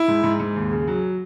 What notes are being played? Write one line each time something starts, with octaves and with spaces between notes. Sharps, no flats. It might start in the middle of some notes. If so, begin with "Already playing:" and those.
Already playing: E4
G#2
G#2
G#2
D#2
C#3
F#3